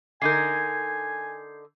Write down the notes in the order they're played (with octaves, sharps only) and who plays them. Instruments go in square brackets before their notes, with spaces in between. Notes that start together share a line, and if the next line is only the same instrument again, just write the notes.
[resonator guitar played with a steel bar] D3 D#4 A#4 [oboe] G#5 [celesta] G6 G#6 C7